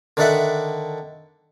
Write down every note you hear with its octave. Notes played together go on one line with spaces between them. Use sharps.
D3 D#3 D4 A4 E5 F#5